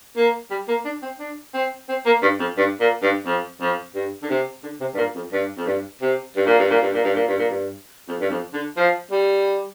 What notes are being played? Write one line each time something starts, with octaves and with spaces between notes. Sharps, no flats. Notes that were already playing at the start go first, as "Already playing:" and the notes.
A#3
G3
A#3
D4
C4
D4
C4
C4
A#3
G2
F2
G2
A#2
G2
F2
F2
G2
D3
C3
D3
C3
G2
A#2
F2
G2
F2
G2
C3
G2
A#2
G2
A#2
G2
A#2
G2
A#2
G2
A#2
G2
F2
G2
F2
D3
F3
G3